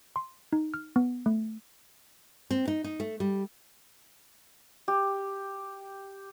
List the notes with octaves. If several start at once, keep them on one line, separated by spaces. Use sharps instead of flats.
C6
D#4
F6
B3
A3
C4
D#4
D#4
A3
G3
G4